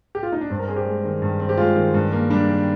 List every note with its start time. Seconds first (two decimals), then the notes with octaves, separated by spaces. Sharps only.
0.15 G4
0.23 F4
0.32 D#4
0.41 D4
0.50 G2 C4
0.59 A#4
0.68 C4 G#4
0.76 G4
0.86 G#3
1.04 D#3
1.22 G2
1.40 C4
1.49 G4
1.57 G#3 F4
1.76 D#3
1.94 G2
2.12 A#3
2.30 G3 D4
2.48 D#3